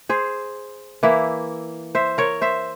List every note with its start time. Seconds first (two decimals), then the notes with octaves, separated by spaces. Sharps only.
0.09 G#4 C5
1.03 E3 A#3 E4
1.95 C5 E5
2.18 A#4 C#5
2.41 C5 E5